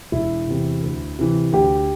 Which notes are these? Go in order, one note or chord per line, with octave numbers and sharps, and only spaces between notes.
E1 E4
E2 C3
D2
C3 E3
D2 G4